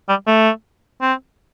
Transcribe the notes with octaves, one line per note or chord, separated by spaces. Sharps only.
G3
A3
C4